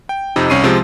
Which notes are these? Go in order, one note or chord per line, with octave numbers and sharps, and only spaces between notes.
G5
F2 C3 D#4
C2 C#4 C#6 C7 D#7
C3 F3 G#3 C4